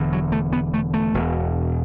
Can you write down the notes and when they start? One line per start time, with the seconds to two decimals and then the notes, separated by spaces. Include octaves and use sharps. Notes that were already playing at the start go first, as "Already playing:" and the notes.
Already playing: E1 E2 D3
0.13 F#3
0.32 A3
0.53 B3
0.74 A3
0.94 A3
1.14 E1 E2 B2